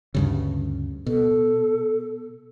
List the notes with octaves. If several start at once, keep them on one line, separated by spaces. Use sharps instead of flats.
D2 G2 C#3
B2 A4